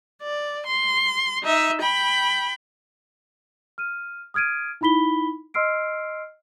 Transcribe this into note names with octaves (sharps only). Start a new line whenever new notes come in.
D5
C6
D#4 E5
G5 B5
F6 D#7
D#6 F6 G#6 D7 D#7
D#4 E4 B5 B6 G7
D#5 C6 E6 F6 C7 D7